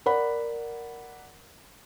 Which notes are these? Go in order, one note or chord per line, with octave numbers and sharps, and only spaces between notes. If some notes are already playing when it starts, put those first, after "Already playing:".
A#4 D5 F#5 B5